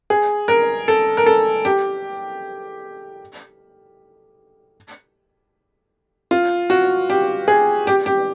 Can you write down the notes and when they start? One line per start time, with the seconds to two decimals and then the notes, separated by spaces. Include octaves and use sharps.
0.10 G#4
0.48 A#4
0.88 A4
1.17 A#4
1.26 A4
1.65 G4
6.31 F4
6.70 F#4
7.10 G4
7.48 G#4
7.87 G4
8.06 G4